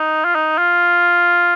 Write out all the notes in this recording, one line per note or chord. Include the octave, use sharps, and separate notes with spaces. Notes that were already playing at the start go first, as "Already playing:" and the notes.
Already playing: D#4
F4
D#4
F4